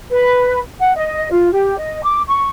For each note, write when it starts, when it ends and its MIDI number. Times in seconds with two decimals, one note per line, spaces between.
0.11 0.60 71
0.80 0.93 78
0.96 1.30 75
1.32 1.52 65
1.52 1.78 67
1.79 2.03 75
2.03 2.21 86
2.28 2.50 85